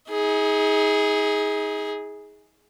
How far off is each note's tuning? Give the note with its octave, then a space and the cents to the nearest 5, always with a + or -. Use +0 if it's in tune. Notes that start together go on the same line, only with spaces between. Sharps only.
D#4 +40 G#4 +0